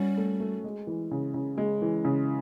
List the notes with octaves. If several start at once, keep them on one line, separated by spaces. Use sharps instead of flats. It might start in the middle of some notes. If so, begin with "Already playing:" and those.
Already playing: G3 C#4 F#4
A3
A3
G#3
E3
C#3
C#3
G#3
E3
C#3